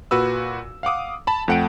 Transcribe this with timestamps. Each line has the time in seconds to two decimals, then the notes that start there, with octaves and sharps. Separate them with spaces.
0.11 A#2 F#4 B4 E6
0.83 F5 F#5 D6 D#6
1.27 A5 B5
1.48 F2 A3 F#5 G5 D7